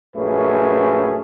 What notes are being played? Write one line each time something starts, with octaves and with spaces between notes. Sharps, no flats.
A#1 F#2 A3 C#4 G#4 B4